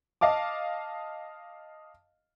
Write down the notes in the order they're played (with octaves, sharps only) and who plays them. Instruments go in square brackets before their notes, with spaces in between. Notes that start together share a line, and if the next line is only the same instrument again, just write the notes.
[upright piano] D#5 F5 A5 D6